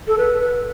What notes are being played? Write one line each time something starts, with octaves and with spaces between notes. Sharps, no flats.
A4
B4
B4